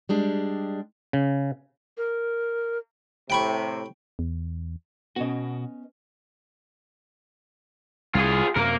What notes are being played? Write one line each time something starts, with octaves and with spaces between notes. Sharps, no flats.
G3 G#3 D4 G4
C#3
A#4
A2 C3 G5 B5 C#6
E2
B2 B3 C#4 F#4 D#5
C2 F4 G#4
F#2 C3 A#3 A#4